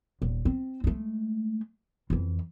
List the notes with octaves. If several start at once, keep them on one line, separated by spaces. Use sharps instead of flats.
D#1
C4
G#3 A3
F2 E3